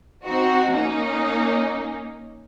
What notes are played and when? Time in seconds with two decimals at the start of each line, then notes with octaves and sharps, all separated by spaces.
0.24 C4 D#4 F#4
0.71 A#3 C#4 D#4